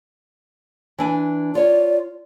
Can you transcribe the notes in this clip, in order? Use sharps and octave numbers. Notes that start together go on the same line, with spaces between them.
E3 D4 G#5
F4 C#5 D5